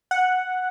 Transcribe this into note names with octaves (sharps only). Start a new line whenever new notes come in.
F#5